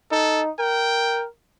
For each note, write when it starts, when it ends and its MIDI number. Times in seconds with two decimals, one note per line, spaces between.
0.11 0.50 63
0.11 0.42 69
0.59 1.25 70
0.59 1.24 79